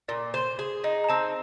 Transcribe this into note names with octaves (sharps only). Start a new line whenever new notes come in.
A#2 D5
C5
G#4
D#4 D#5
A#5
C4 A5